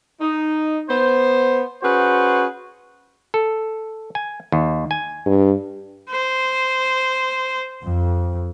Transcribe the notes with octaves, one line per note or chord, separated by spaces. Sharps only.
D#4
B3 C5
C#4 F#4 G#4 B4 C5
A4
G#5
D#2
G#5
G2
C5
F2